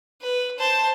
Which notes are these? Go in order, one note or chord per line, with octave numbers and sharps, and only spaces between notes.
B4
C5 A5